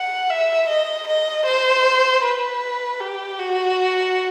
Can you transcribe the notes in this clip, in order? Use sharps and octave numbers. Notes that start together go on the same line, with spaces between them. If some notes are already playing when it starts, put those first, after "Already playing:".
Already playing: F#5
E5
D#5
D#5
C5
B4
G4
F#4